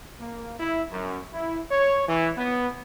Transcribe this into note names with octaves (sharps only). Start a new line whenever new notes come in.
A#3
E4
F#2
E4
C#5
E3
B3